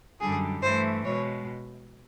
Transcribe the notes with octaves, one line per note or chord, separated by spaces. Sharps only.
F#2 D3 G3 G#4
G2 E3 A3 C5
B2 G#3 C#5